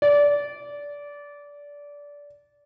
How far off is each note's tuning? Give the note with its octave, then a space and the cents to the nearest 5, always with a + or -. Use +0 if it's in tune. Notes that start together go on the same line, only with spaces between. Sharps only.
D5 -20